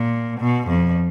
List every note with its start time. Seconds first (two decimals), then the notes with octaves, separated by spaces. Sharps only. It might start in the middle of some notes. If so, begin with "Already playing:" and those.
Already playing: A#2
0.40 B2
0.68 F2